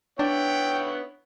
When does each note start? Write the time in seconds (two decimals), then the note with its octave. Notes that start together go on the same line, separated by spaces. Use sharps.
0.19 B3 D4 E4 C#5 G5